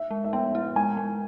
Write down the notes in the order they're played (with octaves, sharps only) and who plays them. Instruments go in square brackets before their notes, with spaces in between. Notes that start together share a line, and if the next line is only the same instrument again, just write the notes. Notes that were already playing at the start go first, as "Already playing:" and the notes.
Already playing: [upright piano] E5
[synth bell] G#3
[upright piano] E5
[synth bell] B3 [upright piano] G5
[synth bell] E4
[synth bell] G#3 [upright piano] G#5
[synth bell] G#3